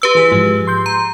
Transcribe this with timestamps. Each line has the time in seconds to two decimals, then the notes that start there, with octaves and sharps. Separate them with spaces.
0.02 G4 B4 E6
0.15 E3 G#4 B6
0.32 G#2 F3 G#3
0.67 C6 G6
0.86 A#5